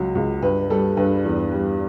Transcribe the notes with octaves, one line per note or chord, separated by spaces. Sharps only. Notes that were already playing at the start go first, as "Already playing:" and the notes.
Already playing: C#2 F#3
C#2
G2 B4
G3 A4
G2 B4
E2
G3